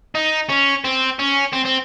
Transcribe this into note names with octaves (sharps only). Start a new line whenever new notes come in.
D#4
C#4
C4
C#4
C4
C4